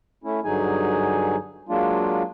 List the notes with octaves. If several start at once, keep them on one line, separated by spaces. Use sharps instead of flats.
A3 C#4 E4
G2 D3 F#3 D#4 G#4 G#5
F#3 G#3 A#3 D4 F4